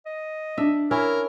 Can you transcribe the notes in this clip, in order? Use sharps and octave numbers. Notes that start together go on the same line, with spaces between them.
D#5
D4 E5
C#4 E4 A#4